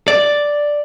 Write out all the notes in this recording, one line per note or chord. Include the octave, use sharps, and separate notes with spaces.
D5